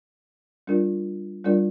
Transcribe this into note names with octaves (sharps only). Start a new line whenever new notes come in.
G3 D4 F4 A#4 D5
G3 D4 F4 A#4 D5